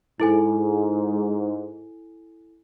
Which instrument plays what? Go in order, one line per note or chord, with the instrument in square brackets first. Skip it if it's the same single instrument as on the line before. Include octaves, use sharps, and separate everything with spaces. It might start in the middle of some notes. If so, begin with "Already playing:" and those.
[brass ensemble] G#2 [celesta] E4 A4 G#5